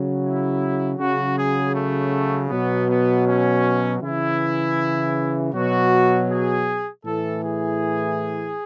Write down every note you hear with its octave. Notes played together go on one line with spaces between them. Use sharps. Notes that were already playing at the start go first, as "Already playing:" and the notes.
Already playing: C#3 F#3
E4
C#3 F#3 F#4
G#4
A3
B2 F#3 B3
B3
C#4
C#3 E3 E4
B2 F#3 F#4
G#4
A2 E3 A4
G#4